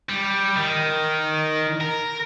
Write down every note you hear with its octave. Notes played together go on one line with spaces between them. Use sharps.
G3
D#3
A#4